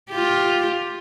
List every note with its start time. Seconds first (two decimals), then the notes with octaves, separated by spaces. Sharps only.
0.10 F4 G4